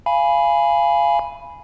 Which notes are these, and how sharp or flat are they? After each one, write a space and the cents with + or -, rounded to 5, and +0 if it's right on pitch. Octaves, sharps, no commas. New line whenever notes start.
F5 -20 G#5 +0 B5 -5